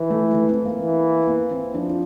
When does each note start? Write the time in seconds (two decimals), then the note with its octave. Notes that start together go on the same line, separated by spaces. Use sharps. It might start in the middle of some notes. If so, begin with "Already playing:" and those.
Already playing: E3
0.10 A3
0.34 A3
0.50 C4
0.65 A#3
0.81 E3
1.28 A#3
1.51 C4
1.74 F3 D4
1.89 D4